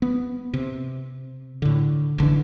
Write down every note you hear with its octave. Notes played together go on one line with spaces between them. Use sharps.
B3
C3
A2 D3
F1 D3 E3 D4